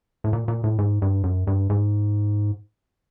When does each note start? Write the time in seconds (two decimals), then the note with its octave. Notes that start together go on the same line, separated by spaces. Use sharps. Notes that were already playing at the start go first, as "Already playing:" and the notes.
0.24 A2
0.33 A#2
0.48 A#2
0.64 A2
0.79 G#2
1.02 G2
1.24 F#2
1.47 G2
1.70 G#2